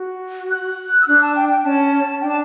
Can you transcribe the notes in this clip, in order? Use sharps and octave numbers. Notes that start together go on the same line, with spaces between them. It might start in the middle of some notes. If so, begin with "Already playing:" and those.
Already playing: F#4
F#6
E6
D4 F#6
A5
G5
G5
C#4 A5
D4 G5
A5